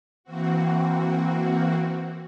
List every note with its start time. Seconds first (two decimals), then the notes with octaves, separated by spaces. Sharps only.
0.24 E3 A#3 C4 F#4